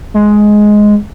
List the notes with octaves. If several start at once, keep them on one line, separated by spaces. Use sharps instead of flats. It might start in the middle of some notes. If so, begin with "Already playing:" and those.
G#3